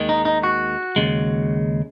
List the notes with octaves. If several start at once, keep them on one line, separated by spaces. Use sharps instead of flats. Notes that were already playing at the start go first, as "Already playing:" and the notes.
Already playing: D#2 D#3 G#3
D#4
D#4
F#4
D#2 C#3 G#3